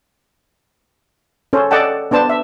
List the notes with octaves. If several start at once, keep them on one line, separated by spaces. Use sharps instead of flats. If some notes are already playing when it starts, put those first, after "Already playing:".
C#4 A4 C5
A4 D5 D#5 F#5 G5 A5
B3 D4 C5 A5
E5